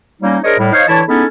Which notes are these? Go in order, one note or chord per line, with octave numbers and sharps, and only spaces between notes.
F#3 G3 A#3 C#4 D#4
D4 G#4 A#4 C5 C#5 D#5
A2 G3
D#4 C5 C#5 D#5 F5
D3 E3 E4 C#5 A5
G#3 B3 C#4 D#4 E4 A4